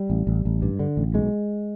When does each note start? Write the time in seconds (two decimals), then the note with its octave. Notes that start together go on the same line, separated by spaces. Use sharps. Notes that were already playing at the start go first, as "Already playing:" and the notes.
Already playing: G3
0.10 A1
0.27 A1
0.45 A1
0.62 G2
0.79 D3
0.97 A1
1.14 B1 G#3